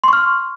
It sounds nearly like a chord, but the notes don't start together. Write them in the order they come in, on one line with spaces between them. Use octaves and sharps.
C6 C#6 F6